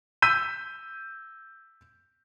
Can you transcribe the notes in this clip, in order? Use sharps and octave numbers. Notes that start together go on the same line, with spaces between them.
E6 G6 B6 D#7